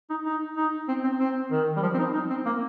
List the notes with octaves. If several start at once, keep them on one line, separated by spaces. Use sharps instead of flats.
D#4
D#4
D#4
C4
C4
C4
D#3
G3
F3
C4
D#4
D#4
C4
A#3